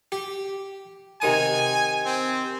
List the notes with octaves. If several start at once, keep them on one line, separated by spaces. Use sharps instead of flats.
G4
C3 D#3 G#5 D#6
C4